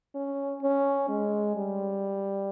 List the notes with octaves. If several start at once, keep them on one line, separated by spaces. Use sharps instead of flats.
C#4
C#4
G#3
G3